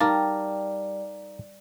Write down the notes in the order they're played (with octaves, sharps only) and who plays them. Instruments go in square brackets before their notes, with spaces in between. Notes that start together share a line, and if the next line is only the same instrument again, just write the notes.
[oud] G3 [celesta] D#4 F5 D6 [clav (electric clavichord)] A#4 A5